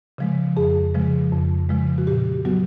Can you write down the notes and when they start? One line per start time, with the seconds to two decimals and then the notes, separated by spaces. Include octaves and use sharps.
0.18 C#3 F3 G#3
0.57 F2 G#4
0.94 C#3 F3 G#3
1.32 F2
1.69 C#3 F3 G#3
1.98 F#4
2.07 A#2 G4
2.45 F#3 B3 F#4